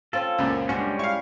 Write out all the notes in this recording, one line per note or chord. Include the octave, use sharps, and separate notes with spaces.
C4 C#4 F4 A4
C#2 F#2 A#2
G3 G#3 C#4 D4 F#4
E4 F5 C#6